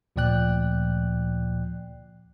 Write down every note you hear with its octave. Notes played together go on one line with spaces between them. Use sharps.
D2 A#2 F3 D5 G5 F#6